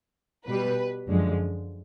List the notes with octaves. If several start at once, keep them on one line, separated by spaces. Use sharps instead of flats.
B2 G3 B4
F#2 D3 F3 G#3